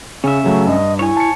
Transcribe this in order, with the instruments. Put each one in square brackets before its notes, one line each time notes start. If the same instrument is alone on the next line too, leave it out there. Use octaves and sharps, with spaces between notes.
[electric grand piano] C#3 [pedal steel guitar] C#4 E5
[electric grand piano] C#3 F#3 A3
[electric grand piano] G2 [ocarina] D#5
[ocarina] E4 [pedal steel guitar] C#5 G#5
[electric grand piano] A5 C#7